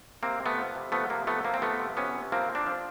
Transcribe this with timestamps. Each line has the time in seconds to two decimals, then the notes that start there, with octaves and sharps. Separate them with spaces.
0.23 C3 A#3 C4
0.40 C3
0.46 A3 B3
0.58 F3
0.75 C3
0.92 F3 A3 B3
1.10 C3 A#3
1.27 F3 A3 B3
1.44 F3 A#3
1.54 C4
1.62 F3 A3 B3
1.80 C3
1.97 C3 B3 C#4
2.15 C3
2.32 F3 A#3 C4
2.50 F3
2.55 C4 D4
2.67 F3